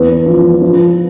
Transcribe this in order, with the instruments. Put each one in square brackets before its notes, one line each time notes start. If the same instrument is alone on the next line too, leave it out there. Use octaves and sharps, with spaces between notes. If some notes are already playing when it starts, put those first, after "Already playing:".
Already playing: [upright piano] E2 B4
F3
F3